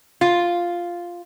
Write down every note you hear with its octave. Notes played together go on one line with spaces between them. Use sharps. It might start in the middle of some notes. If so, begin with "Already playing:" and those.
F4